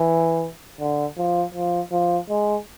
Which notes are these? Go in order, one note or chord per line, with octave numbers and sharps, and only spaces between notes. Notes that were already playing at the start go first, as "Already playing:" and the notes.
Already playing: E3
D3
F3
F3
F3
G#3